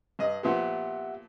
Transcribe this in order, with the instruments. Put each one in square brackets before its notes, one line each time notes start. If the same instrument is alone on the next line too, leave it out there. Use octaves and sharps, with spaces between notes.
[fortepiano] G2 D#5
[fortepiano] A#2 F3 B3 [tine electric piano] G4 E5 F#5